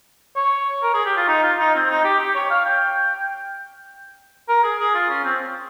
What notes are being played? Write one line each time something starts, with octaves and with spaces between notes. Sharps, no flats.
C#5
A#4
G#4
G4
F4
D#4
F4
D#4
C4
D#4
G4
G4
C#5
F5
G5
A#4
G#4
G#4
F4
C#4
C4